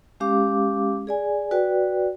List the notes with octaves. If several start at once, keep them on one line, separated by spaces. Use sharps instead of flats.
G#3 C#4 G4 F5 D6
G#4 D5 G#5
F#4 B4 D5 G5